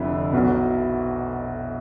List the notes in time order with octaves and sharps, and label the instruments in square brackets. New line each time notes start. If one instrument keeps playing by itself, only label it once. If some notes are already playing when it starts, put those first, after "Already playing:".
Already playing: [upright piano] F1 F2 D3 E4
B1 B2